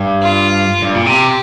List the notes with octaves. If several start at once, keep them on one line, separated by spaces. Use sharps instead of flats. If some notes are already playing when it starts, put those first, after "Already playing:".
Already playing: G2
F4
G2
A#2
C3 G4